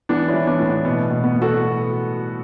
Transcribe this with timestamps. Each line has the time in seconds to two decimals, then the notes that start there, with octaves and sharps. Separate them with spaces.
0.09 E3 B3 D4
0.28 C#4 E4
0.34 E3
0.47 B3 D4
0.59 A2
0.66 B3
0.85 B2 B3
1.11 B2
1.24 B3
1.35 B2
1.42 F#4 A4